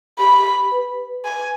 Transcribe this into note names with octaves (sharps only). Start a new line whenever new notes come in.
G4 B5
B4
G#5